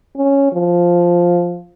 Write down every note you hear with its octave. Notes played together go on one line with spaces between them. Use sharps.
C#4
F3